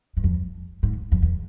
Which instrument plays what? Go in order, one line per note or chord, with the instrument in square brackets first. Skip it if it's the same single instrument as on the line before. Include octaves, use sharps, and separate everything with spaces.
[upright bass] G2
F2
G#2
F2
E2